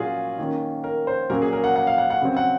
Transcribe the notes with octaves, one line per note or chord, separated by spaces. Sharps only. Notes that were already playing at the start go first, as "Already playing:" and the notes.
Already playing: A#2 F#3 A#3 C#4 F4 F#4 G#4
D#3 A#3 C#4
A#4
C5
A#2 F#3 A#3 C#4 A#4
G#4
A#4
F#5
F#5
F5
F#5
F#5
C#3 F#3 C4
F#5